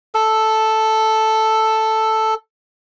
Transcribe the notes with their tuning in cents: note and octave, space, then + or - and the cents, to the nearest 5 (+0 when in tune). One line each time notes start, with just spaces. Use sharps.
A4 +0 E6 +0